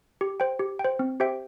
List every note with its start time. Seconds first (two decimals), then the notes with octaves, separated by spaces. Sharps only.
0.21 G4
0.40 C5 G5
0.59 G4
0.79 G5
0.85 C5
0.99 C4
1.20 G4 C5 E5 G5